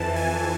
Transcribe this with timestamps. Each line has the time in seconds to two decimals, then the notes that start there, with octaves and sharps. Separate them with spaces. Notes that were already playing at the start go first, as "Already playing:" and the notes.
Already playing: F2 E3 A5
0.16 G#5